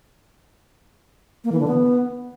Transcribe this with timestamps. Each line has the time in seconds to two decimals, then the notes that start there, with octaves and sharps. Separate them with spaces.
1.44 A#3
1.52 E3
1.60 D3
1.67 B3